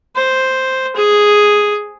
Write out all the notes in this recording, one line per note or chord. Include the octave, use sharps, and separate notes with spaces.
C5
G#4